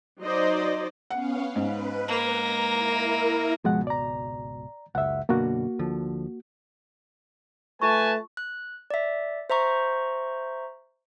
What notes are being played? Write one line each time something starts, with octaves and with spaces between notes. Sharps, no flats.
F#3 D#4 C5 D5 D#5
B3 C#4 F5 F#5
G#2 B4
A#3 A#5 A#6
E4 A#4
G#1 C#2 B2 F3 G#3 F#5
D5 A#5
F#1 C#2 E5 F#5
F#2 B2 D3 A#3 F#4
D2 D3 F3
A3 F4 B4 G#5 A5 C#6
F#6
D5 E5
C5 E5 A#5 C#6